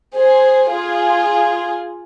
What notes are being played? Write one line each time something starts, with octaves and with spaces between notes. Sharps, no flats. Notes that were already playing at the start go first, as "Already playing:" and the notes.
G#4 C5
F4 G#4